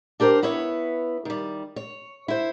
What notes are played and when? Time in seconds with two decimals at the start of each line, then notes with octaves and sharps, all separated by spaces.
0.20 D4 G4 A#4 C5
0.43 B3 E4 B4 C#5
1.25 D#3 G3
1.76 C#5
2.28 E4 C5